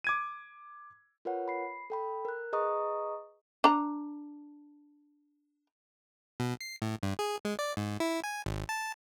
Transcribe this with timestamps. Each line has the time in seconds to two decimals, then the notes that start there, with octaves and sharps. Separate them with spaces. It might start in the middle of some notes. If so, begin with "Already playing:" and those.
0.04 D6 G#6 D#7
1.25 F4 A#4 B4 C#5 F#5
1.48 B5 C7
1.90 A4 G5 B5
2.25 A#4 F#6
2.53 G#4 B4 D#5 A#5 C#6 D#6
3.64 D4 A#5
6.40 B2
6.61 C7
6.82 A2
7.03 G2
7.19 G#4
7.45 G#3
7.59 D5
7.77 G#2
8.00 E4
8.24 G#5
8.46 G#1
8.69 A5